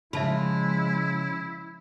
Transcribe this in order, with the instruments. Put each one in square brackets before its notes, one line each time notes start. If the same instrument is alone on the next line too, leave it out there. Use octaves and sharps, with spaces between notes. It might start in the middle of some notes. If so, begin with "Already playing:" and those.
[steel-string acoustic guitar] C#3 [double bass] F3 G#3 [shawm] E4 [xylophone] E5 A5 B5